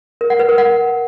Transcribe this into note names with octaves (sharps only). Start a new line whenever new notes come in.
A#4
F#5
B4
A#4
F#5